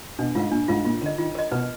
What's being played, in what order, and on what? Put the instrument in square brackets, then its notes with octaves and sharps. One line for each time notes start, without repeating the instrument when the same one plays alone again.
[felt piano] B2 [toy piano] D4
[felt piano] G#2 [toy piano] F4 A#4 F5
[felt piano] A#2 [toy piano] D4
[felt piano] G#2 [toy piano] F4 A#4 F5
[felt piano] A#2 [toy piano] F4
[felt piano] D3 [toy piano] A#4
[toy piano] D#5
[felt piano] D#3 [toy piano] F4
[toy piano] A#4 D#5
[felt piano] B2 [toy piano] B4